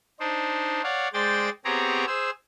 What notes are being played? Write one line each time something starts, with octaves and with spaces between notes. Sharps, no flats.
D4 D#4 C5
C#5 D5 F5 F#5
G#3 C5 D5 G5 A6
B3 C4 G4 G#4 C#5 A#5
G#4 C5 E6